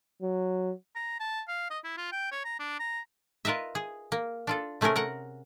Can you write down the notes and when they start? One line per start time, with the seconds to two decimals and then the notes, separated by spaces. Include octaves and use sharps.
0.22 F#3
0.96 A#5
1.20 A5
1.48 F5
1.70 D#5
1.84 E4
1.97 F4
2.12 G5
2.32 C#5
2.45 A#5
2.59 D4
2.80 A#5
3.45 F4 A#4 B4 D#5 E5
3.75 G#4
4.12 A#3
4.47 D4 F4 A4
4.81 C3 A3 C#4 G#4 A#4
4.96 A#4 F#5 A#5